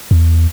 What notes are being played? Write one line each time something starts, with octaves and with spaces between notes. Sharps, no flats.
E2